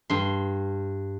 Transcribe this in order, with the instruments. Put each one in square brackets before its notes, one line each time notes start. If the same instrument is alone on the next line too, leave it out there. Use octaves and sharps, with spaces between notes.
[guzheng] G2 C6